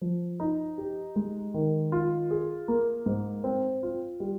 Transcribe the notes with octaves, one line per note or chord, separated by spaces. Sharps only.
F3
D#4
G4
G#3
D#3
F4
G#4
A#3
G#2
C4
F4
G3